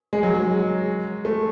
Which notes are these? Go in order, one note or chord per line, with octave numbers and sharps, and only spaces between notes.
G#3
F#3
G#3
A3